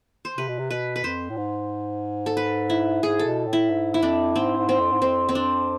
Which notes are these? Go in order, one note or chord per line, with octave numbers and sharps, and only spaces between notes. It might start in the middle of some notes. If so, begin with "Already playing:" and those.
C5
C3 B4
B2
C3
B2 B4
B4
F2 C5
A2
G#2
A4
B4
E4
G#2 G#4
A4
B2
A2
E4
G#2
E4
F2 D4
G#2 C4
G#2
C4
F2
G#2
F2 C4
C4
D4